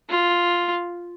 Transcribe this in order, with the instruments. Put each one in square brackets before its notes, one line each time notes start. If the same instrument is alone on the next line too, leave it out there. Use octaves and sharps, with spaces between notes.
[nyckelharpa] F4